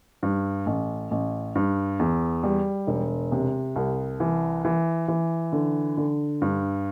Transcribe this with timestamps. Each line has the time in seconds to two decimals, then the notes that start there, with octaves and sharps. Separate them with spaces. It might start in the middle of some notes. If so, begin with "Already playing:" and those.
0.23 G2
0.66 A1
1.11 A1
1.55 G2
1.99 E2
2.43 G3
2.87 E1
3.32 C3
3.76 C2
4.20 E3
4.65 E3
5.08 E3
5.53 D3
5.97 D3
6.42 G2